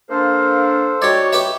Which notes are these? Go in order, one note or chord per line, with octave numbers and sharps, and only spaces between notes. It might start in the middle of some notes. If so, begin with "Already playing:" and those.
A#3 D4 A4 C5 F5
D#4 F#4 G4 C#5 D5
G4 B4 E5